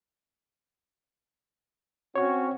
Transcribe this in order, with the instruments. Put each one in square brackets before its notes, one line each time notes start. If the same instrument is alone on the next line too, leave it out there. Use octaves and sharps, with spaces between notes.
[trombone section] C4 C#4 F#4 [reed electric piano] C#5 C#6